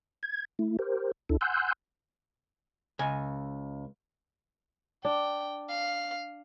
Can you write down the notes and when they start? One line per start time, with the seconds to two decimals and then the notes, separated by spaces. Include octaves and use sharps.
0.23 G#6
0.59 A3 E4
0.79 G4 A#4 C5
1.29 D2 D4 E4 A4
1.41 F#5 G#5 C6 E6 F#6 G6
2.99 C#2 G#5
5.05 D4 G5
5.69 F5